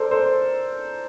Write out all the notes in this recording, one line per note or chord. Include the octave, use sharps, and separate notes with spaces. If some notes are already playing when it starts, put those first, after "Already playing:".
Already playing: A4 A#4 C5 D5
A4 C5